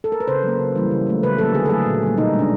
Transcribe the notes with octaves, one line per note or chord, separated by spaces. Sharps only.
A4
A#4
B4
C#3 C5
F#3 A#3
C#3
E3 G3 A#3
C#3
F#3 A3
C#3 B4
F#3 A#3 A4
D3 G#4
A4
F#3 A3 G#4
A#2
G3 A#3
B2 D#4
G#3 D4